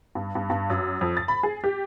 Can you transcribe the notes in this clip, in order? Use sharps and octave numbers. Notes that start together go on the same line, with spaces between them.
G2
G2
G2
F#2
F2
A6
B5
G#4
G4